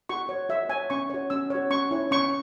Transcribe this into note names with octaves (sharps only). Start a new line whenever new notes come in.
F#4 C#6
C#5
F#4 E5
C#5 G#5
C#4 C#6
F#4 C#5
C#4 E6
F#4 C#5
C#4 C#6
E4 C#5
C#4 C#6